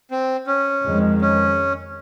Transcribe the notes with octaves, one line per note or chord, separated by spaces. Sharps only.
C4
C#4
F2 D#3 G#3
C#4